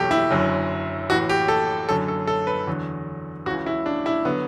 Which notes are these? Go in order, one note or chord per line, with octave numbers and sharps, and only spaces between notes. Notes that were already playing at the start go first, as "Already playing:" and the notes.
Already playing: F#1 E2 B2 F#3 G4 A4
E4
F#1 F#2 D3 F#3
A1 A2 E3 F#4
G4
A4
F#1 F#2 D3 F#3 A4
A4
A4
B4
E2 D3 F#3
C#2 C#3 E3 F#4
E4
D4
E4
D3 F#3 B3